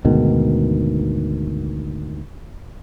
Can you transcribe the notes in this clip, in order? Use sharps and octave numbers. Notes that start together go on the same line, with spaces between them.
D2 G#2 B2 D#3